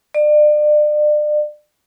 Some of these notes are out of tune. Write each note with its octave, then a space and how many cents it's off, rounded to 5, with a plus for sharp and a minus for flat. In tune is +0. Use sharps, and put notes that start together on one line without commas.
D5 +35